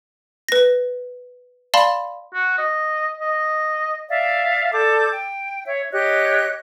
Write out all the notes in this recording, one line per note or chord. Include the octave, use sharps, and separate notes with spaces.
B4 A#6
D5 F5 A5 B5 C6
F#4
D#5
D#5
D5 E5 F5
A4 D5 D6 G6
G5
C#5 E5
G4 C#5 D#5 F#6